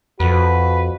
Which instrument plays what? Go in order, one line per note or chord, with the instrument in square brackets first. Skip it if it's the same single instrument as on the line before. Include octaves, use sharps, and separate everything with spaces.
[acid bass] F2 [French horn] F#4 [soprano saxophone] B4